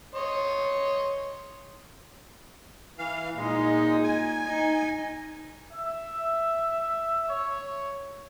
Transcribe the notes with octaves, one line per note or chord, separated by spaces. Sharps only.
C#5 D#5 C6
E3 F5
A#2 G#3 D#4
G#5
D#4
E5
C#5